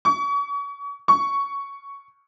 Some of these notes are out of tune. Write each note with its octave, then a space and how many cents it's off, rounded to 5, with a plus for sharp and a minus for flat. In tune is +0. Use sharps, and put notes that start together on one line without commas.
C#6 +35
C#6 +5